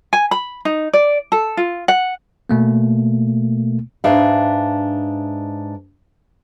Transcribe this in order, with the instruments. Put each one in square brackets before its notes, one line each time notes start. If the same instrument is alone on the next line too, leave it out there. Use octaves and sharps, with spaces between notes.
[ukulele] G#5
B5
D#4
D5
A4
F4
F#5
[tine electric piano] B2 A3 A#3
[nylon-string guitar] G#2 D4 B4 E5 F5